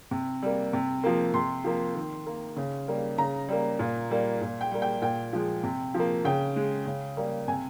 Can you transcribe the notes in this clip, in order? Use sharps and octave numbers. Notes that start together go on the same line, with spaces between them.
C3
G3 A#3
C3
F3 A#3
C3 C6
F3 A#3
D#3
A#3
C#3
G3 A#3
C#3 A#5
G3 A#3
A#2
G3 A#3
A#2
G5
G3 A#3
G5
A#2 G5
F3 G#3
C3
F3 A#3
C#3 G5
G#3
C#3
G3 A#3
C3 G#5